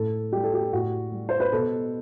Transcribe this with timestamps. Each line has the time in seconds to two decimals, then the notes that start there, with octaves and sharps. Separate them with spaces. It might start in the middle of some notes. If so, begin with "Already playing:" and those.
Already playing: A2 A4
0.32 G3 G4
0.44 A4
0.54 G4
0.72 A2 F#4
1.12 G3
1.29 C5
1.40 B4
1.52 B2 A4